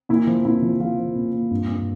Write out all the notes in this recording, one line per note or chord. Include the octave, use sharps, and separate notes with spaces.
A#2 E4
F3
A#2 E4
F3
F3 F4
F3
A#2
A#2
G2
G2